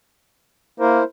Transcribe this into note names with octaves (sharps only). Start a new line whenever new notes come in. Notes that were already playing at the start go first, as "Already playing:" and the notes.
A#3 E4 A#4 C5